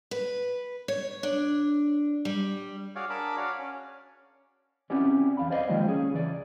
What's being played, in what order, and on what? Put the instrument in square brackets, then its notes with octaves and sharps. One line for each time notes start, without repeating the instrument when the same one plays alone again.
[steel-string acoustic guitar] B4
C#5
D4
G3
[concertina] F#4 G#4 C#5 D5 F5
D4 G#4 A#4 A5 B5 D6
F#4 C#5 D5 F5
C#4
[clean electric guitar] C4 C#4 E4 F#4 G4 D5
E2 F5 B5
C5 D5 D#5 F5
D#3 F3 G#3 A#3 F4 G4
C#4 G#4
C#2 E3 D5